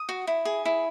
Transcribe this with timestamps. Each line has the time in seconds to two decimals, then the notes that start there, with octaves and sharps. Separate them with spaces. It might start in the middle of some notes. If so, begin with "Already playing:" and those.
Already playing: D#6
0.09 F#4
0.27 E4
0.45 G#4
0.65 E4